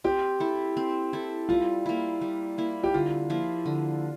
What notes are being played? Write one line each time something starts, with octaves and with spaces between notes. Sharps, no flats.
C4 G4
E4 A4
C4
E4 A4
G3 F4
A#3 E4
G3
A#3 E4
G4
D3 F4
F3 A#3 E4
D3